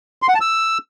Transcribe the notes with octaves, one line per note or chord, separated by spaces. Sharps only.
C6
F#5
A5
E6